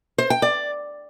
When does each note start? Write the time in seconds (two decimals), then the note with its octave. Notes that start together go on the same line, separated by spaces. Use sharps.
0.18 C5
0.30 G5
0.42 D5